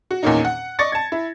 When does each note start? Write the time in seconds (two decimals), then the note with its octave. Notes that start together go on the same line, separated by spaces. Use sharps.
0.11 F#4
0.23 E2 A#2 D#3 A#3 C#4 D#4
0.45 F#5
0.79 D5 D#5 C#6 A6 A#6 C#7
0.92 A5 G#6
1.12 E4